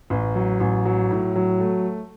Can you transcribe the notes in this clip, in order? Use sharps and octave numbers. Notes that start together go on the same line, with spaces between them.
A1
F#3
A1
F#3
A2
F#3
A3